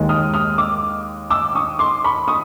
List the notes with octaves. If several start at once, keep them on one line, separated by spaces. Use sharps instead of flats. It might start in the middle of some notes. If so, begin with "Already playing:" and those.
Already playing: D#2 D#3 G#3
D#6 F6
D#6 F6
D6 E6
D6 E6
C#6 D#6
C6 D6
B5 C#6
C#6 D#6